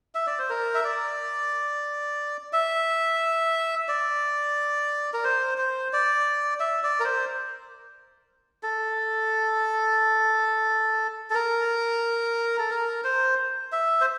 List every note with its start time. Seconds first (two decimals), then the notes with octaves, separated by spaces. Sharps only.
0.15 E5
0.27 D5
0.39 C5
0.49 A#4
0.75 E5
0.84 D5
2.53 E5
3.88 D5
5.13 A#4
5.24 C5
5.58 C5
5.93 D5
6.60 E5
6.83 D5
7.00 A#4
7.05 C5
8.63 A4
11.30 A4
11.35 A#4
12.59 A4
12.70 A#4
13.04 C5
13.72 E5
14.01 C5